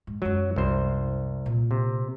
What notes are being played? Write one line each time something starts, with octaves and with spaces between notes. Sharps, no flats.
G#2
F#2 F#3 G#3
C2 C5
A#2
C3